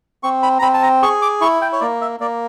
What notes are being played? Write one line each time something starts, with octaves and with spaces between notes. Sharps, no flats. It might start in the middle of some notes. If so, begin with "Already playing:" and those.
C4 C#6
B5
A#5
C4 B5
A5
A#5
G#4 C#6
D6
E4 C#6
G5
C#5
A#3 D5
E5
A#3 D5